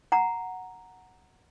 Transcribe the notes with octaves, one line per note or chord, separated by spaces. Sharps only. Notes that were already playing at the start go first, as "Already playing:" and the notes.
F#5 A#5